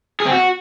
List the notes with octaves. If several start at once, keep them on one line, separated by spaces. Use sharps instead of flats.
G#4
C4
F#4